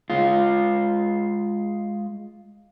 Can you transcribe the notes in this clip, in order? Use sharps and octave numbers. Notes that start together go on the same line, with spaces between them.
G#3 F4